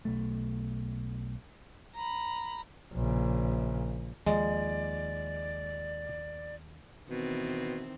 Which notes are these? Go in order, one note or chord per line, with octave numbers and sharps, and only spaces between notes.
B1 A3
A#5 B5
A#1 C#3
D#2 F3 G#3 D5
B2 D#3 E3 C4